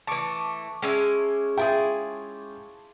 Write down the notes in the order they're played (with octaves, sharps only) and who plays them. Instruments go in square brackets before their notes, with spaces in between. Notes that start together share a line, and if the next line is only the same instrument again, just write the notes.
[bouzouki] E3 A3 [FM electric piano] A5 C#6 D6
[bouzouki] G#3 C#4 E5
[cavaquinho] E4 F4 G#4 [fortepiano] G5